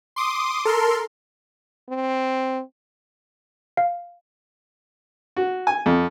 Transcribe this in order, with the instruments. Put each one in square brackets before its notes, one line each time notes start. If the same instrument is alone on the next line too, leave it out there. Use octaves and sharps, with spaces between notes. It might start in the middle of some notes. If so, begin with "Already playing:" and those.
[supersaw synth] C6 D6 D#6
A4 A#4 C6
[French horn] C4
[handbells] F5
[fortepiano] F#4
G#5
F2